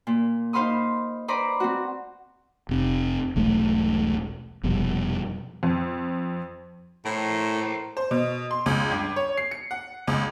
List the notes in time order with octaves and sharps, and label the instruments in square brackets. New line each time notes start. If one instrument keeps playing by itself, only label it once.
[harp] A#2
D#4 C5 F5 B5 C6 D#6
B4 C5 D5 A#5 B5
C4 F#4
[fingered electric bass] F1 C3
E1 B1 A3
F1 F2 B2 G3
[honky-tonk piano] F2
[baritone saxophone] A2 [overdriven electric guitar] A#4 C5
[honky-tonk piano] C5
B2
C6
C#2
G2
C#5
C7
C#7
F#5
C#2